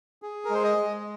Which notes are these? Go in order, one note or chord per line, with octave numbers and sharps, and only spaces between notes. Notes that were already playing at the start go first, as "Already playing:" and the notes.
G#4
A#4
G#3 C5
D#5
G#3